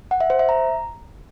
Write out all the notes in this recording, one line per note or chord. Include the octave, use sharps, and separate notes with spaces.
F#5
E5
C5
E5
A#5